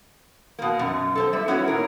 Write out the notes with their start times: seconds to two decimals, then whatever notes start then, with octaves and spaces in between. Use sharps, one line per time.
0.59 B2 A#3
0.79 F#2 B2
1.15 A4 A#4 C5
1.33 G3 E5
1.48 B3 C#4 E4 F#4 C#5
1.68 A#2 A#4